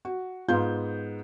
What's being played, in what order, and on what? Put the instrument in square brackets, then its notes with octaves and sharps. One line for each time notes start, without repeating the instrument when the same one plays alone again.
[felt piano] F#4
[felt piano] G#2 B3 G6 [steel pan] F4